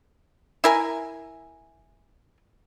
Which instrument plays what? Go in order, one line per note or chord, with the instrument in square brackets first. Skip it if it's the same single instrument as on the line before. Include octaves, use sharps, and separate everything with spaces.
[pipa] E4 A#4 G#5